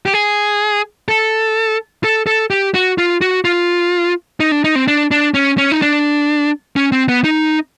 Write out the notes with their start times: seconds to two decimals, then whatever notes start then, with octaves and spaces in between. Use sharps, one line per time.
0.06 G4
0.14 G#4
1.08 A4
2.04 A4
2.27 A4
2.50 G4
2.74 F#4
2.98 F4
3.21 F#4
3.45 F4
4.40 D#4
4.52 D4
4.64 D#4
4.76 C4
4.88 D4
5.11 D4
5.34 C#4
5.58 C#4
5.72 D#4
5.82 D4
6.76 C#4
6.92 C4
7.09 B3
7.24 D#4